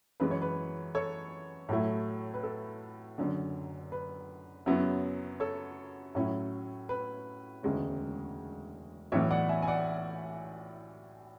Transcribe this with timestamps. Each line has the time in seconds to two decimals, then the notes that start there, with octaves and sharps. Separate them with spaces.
0.20 F#2 E3 G#3 B4
0.31 C#5
0.42 B4
0.95 A4 C#5
1.69 A2 F#3 A3 E4
2.34 B4
2.43 A4
3.18 F#1 F#2 D3
3.92 B4
4.66 F#2 C#3 F#3 B3 E4
5.40 A4 C#5
6.15 A2 F#3 C#4 E4
6.89 B4
7.63 E1 D2 C#3 G#3 C#4
9.12 B1 A2 E3 B3 C#5 E5
9.31 D5 F#5
9.49 E5 G#5
9.62 G#5
9.67 D5 F#5